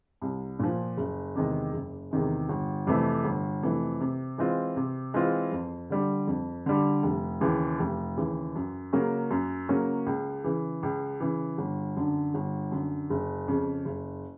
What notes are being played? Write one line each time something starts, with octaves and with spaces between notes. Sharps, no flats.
C2
A#2 F3
F#1
E2 C3 D#3 G#3
F#1
E2 C3 D#3 G#3
G1
F2 C3 E3 A3
G1
F2 C3 E3 A3
C3
E3 G#3 C4 F4
C3
E3 G#3 C4 F4
F2
D3 G3
F2
D3 G3
F1
D#2 C#3 E3
F1
D#2 C#3 E3
F#2
C#3 F#3 A#3 C#4
F#2
C#3 F#3 A#3 C#4
C#2
C#3 E3
C#2
C#3 E3
G1
F#2 D3
G1
F#2 D3
F#1
F2 C#3
F#1